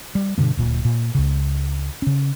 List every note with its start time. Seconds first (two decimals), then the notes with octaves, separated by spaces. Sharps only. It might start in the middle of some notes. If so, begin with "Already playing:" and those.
0.15 G3
0.38 G2 B2 D3 A#3
0.57 D1 A#2
0.85 A#2
1.15 C#2 C#3
2.02 C#3 C#4